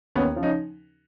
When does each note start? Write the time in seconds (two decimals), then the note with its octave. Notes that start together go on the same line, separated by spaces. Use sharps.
0.16 D#2 B3 C#4
0.36 C#3 F3
0.43 C#4 D#4